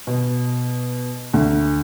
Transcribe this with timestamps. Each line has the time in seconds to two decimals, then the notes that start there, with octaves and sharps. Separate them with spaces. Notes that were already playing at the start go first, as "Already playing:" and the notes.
0.07 B2
1.34 D2